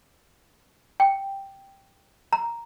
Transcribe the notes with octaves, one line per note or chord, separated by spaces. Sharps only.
G5
A#5